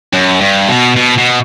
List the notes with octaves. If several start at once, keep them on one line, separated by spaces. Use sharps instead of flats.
F#2
G2
B2
B2
B2